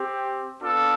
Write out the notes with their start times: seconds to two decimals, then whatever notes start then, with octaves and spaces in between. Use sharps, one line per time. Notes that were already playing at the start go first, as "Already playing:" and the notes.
Already playing: C4 G4
0.61 B3 D4 F4 A4